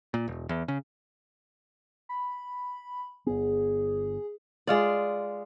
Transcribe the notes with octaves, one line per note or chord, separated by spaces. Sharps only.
A#2
E1
E2
C#3
B5
G1 B3 G#4
G#3 F4 D5